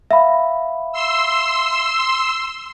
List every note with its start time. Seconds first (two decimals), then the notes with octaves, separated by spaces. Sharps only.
0.11 E5 F5 B5
0.92 C6 E6